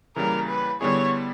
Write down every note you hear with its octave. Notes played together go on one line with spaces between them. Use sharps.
C#3 E3 G3 A#3 A#4
B4
D3 G3 B3 E4 G#4 C#5